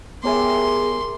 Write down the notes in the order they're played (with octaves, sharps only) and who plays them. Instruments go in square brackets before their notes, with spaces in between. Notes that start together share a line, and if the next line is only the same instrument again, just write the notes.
[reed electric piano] B3 C#5 G#5 [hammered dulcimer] G4 A#4 E5 [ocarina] G#4 [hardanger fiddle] C6